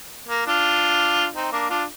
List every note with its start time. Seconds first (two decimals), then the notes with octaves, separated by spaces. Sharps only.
0.29 A#3
0.47 D4 F4
1.35 C4 D#4
1.52 A#3 D4
1.70 D4 F4